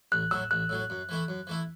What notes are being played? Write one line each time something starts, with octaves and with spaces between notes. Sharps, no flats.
A1 F#6
A2 F#3 E6
A1 F#6
A2 F#3
F#2
E3 A3 E4
F#2
E3 A3 E4